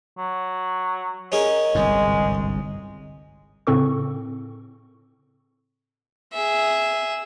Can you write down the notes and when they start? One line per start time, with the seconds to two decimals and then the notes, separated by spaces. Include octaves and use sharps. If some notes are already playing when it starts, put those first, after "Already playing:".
0.18 F#3
1.32 C#4 G#4 A#4 D#5
1.75 G1 C2 G#2 G#3
3.67 A2 C#3 C4 A4 C#6
6.34 G#4 E5